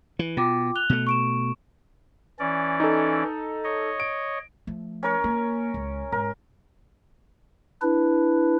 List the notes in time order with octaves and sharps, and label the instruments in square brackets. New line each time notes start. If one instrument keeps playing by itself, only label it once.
[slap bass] E3
[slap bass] B2 [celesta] F4 G5 D6
[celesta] F#6 F7 G7
[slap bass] B2 A3
[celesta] C#6 D7 E7
[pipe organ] E3 C#4 D5
[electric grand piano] D#4 A4
[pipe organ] C#5 D#5
[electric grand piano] D7
[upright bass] F3 A3
[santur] C#4 A#4 C#5
[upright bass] A#3
C#2
[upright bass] G#2 [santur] A#4
[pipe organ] D4 E4 B4